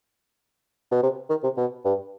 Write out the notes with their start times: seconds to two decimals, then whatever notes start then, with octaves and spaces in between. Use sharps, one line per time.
0.91 B2
1.03 C3
1.30 D#3
1.43 C3
1.57 B2
1.85 G2